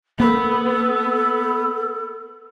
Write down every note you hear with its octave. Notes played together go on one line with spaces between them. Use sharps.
A#3 B3 A4 B4